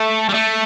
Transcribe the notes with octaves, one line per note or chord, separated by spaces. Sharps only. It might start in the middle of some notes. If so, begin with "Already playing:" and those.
Already playing: A3
G3
A3